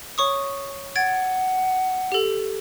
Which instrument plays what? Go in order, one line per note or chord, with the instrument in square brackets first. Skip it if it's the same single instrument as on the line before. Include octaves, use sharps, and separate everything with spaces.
[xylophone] C#5 C#6 D#6
[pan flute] F#5 [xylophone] G#6 A6 D7
[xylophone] G4 A4